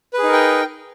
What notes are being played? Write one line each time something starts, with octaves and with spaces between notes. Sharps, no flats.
D#4 G#4 A#4 B4 G5